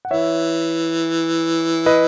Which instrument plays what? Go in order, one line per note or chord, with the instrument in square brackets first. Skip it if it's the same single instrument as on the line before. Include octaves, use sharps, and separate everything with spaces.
[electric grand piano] F#5
[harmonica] E3 [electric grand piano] C#5 E5
[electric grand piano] B4 D#5